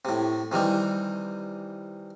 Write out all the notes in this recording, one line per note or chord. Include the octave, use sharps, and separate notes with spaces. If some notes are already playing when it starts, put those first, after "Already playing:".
A2 C3
C3 D#3 E3 G3